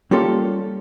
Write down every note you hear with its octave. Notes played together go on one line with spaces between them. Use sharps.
G3 A#3 C#4 F4 G4 A4